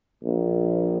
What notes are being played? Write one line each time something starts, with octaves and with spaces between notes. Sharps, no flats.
A#1